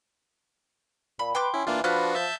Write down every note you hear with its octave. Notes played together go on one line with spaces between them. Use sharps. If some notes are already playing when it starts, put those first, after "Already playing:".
A#2 B5
B4 G5 C6 D6
C#4 E4
E3 A#3 D4 F4
F3 D4 F4 F#4 B4 F6 F#6
E5 A5 G6